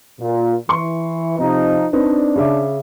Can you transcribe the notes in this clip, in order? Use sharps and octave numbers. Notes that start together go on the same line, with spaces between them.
A#2
E3 C6 C#6
C3 F3 D#4
C4 D4 D#4 B4
C#3 E5 D6